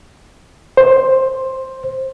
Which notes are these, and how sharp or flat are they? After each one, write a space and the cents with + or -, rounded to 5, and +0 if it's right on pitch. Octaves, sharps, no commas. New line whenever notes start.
C5 +10